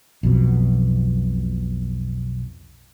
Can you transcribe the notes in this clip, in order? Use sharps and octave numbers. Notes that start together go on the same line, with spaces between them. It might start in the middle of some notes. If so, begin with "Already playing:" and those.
B1 F2 B2